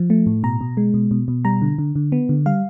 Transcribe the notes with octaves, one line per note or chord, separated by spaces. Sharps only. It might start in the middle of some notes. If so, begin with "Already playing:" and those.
Already playing: F3
A3
A2
B2 A#5
B2
G#3
B2
B2
B2
G3 A#5
D3
D3
D3
B3
D3
G3 F5